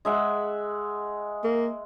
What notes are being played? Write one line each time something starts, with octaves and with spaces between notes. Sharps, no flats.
G#3 E5 F#5
A#3